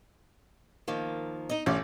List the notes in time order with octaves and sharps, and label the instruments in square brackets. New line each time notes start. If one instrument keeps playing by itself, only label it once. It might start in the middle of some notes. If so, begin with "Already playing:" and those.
[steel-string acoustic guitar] D#3 F3 A#3
D#4 D#5
[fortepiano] A1 C#4 [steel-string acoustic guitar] D5